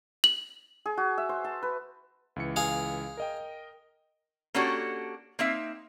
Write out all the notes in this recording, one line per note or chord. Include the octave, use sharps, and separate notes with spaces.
F#7
G#4
F#4
E5
C5
A5
B4
C#2 E3 C#7
G#4 F5
A#4 D#5 G5
A#3 C#4 D4 F#4 G4 A4
A#3 C4 D#4 E5